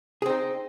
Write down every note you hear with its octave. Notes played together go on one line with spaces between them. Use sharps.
C4 D#4 G#4